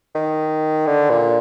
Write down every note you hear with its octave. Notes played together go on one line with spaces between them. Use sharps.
D#3
D3
A#2